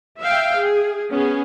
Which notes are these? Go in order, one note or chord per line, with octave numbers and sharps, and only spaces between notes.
E5 F5 G5
G#4
B3 C#4 G#4